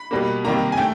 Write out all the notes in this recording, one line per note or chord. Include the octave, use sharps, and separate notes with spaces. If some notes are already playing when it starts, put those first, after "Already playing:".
Already playing: B5
B2 G3 A#3
C3 D#3 G3 A#3 A#5
G#5
A3 G5